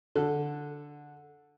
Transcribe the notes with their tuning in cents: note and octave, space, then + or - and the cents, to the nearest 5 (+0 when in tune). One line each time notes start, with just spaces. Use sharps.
D3 +0 A4 +0